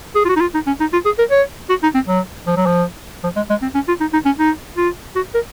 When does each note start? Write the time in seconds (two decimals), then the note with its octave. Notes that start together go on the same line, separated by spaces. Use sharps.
0.15 G#4
0.25 F4
0.29 F#4
0.36 D#4
0.41 F4
0.54 D#4
0.67 C#4
0.80 D#4
0.93 F4
1.05 G#4
1.19 A#4
1.30 C#5
1.69 F#4
1.83 D#4
1.95 C4
2.08 F#3
2.47 F3
2.56 F#3
2.66 F3
3.23 F3
3.36 G#3
3.50 G#3
3.62 C4
3.74 C#4
3.88 F4
4.00 D#4
4.13 D#4
4.26 C#4
4.38 D#4
4.77 F4
5.16 F#4
5.35 A#4